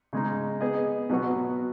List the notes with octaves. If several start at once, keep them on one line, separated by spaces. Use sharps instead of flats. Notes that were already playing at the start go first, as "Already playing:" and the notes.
C#3 G#3 D#4
B3 G#4 D#5
B2 F#3 B3 F#4